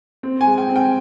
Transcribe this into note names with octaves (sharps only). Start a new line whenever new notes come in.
C4
G#5
G#3
G5
C4
G5